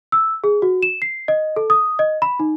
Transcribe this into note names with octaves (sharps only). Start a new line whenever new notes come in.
E6
G#4
F#4
E7
C7
D#5
A4
D#6
D#5
B5
D#4